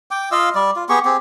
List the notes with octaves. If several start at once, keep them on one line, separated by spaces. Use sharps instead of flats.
G5 D6
F4 D#5 F5 E6
G3 D5
F4
B3 G4 G#4 C#6
C4 G4 G#4